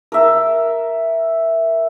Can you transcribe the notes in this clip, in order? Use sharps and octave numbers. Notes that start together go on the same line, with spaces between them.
A#4 E5